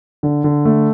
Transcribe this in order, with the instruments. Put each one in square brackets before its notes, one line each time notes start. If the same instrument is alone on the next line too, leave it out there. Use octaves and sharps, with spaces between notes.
[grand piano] D3
D3
A3